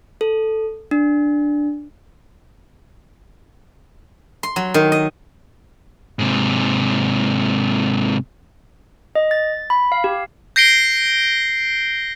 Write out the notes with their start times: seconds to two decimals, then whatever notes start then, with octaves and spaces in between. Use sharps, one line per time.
0.21 A4
0.91 D4
4.43 C6
4.56 F#3
4.74 D#3
4.92 D#5
6.19 G#2 C3
9.15 D#5
9.31 A6
9.70 B5
9.92 F5
10.04 G4
10.56 G6 A#6 C7 D7 G7